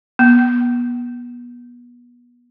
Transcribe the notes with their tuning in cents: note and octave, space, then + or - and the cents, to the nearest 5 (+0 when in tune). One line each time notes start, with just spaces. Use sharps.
B3 -25